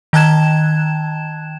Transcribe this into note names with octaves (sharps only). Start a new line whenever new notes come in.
D#3 G5 A5 F#6 G#6 E7